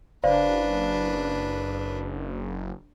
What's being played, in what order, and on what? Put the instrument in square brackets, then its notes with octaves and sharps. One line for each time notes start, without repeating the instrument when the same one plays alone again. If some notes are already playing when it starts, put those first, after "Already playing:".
[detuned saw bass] F#1 [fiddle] D4 B4 [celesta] C5 D5 F5